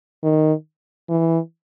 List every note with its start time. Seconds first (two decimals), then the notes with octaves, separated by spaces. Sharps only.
0.23 D#3
1.09 E3